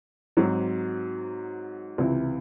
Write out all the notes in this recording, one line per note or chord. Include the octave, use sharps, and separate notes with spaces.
G#2 F#3 C4
C#2 C3 E3 C4 E4